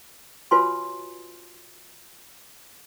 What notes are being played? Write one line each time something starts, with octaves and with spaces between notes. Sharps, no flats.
F4 F#4 B4 C#5 G#5 C6